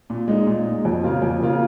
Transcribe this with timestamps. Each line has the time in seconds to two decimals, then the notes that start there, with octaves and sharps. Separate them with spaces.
0.10 A#2
0.28 G#3 D#4
0.46 A#2
0.66 G#3 D#4
0.85 F2
1.04 C#3 A#3 F4
1.22 F2
1.41 C#3 A#3 F4